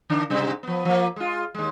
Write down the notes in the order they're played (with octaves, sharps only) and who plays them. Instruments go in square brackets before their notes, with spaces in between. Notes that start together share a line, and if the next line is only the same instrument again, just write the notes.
[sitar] D3 D#3 D4
G#2 C3 G3
F3 B3
F3 A#3
G#3 F4
D#2 G#3